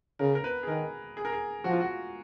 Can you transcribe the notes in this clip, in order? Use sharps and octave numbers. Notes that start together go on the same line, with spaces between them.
C#3 A#4
A#4
B4
G#4
D#3 A#4
G#4
A#4
G#4
F3 F#4
F4
F#4